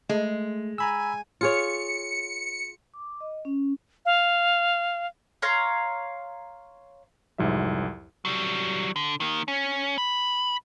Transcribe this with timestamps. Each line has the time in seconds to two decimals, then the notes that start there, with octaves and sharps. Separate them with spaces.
0.10 G#3 A3
0.78 G#5 A#5 B5 E6
1.41 F4 G#4 C#5 C#7
2.94 D6
3.20 D#5
3.45 C#4
4.05 F5
5.42 C#5 F5 A#5 C6
7.38 C2 F2 G#2 F#3 E5
8.25 F#3 G3
8.96 D3
9.20 D#3 A#3
9.48 C#4
9.98 B5